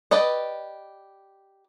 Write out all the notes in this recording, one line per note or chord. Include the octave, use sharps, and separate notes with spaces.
G4 B4 D5 D#5